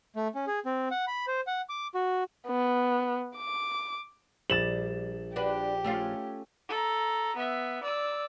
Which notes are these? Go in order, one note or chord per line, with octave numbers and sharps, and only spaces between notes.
A3
C#4
G#4
C4
F#5
B5
C5
F#5
D6
F#4
B3
D6
A#1 G3 A6 E7 F#7
D4 F#4 G4 B4
A3 C#4 F4
A4 A#5
B3 E5
D5 E6